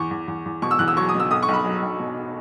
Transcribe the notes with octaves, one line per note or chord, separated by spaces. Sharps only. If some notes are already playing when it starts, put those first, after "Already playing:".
Already playing: E2 C#6
E2
E2
E2
B2 C#6
E6
E2 F#6
E6
F#3 C#6
D#6
B2
E6
B1 D#6
C#6
B1 B5
F#3
B1
B2